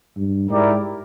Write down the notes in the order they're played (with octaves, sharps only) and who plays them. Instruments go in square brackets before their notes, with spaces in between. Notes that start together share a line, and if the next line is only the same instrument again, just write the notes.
[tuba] G2
[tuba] G#2 [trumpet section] E4 G4 A#4 D5